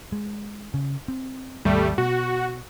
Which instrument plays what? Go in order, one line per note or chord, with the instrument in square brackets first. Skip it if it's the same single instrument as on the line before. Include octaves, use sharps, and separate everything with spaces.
[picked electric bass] G#3
C#3
C4
[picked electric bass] G#1 D#2 B2 [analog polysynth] G3 A3
[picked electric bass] B2 [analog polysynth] F#4